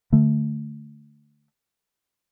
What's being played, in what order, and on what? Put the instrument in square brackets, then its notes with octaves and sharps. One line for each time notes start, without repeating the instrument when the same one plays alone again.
[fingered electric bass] D3 A3